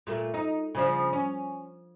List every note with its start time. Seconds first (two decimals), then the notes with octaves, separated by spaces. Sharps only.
0.07 A#2 A3
0.34 D#4
0.75 C#3 F3 D4
1.13 C#4